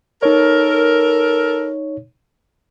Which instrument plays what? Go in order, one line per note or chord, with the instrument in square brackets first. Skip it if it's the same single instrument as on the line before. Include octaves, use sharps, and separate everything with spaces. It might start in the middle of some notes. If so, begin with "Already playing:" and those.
[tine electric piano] D#4 C#5 [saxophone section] A4 A#4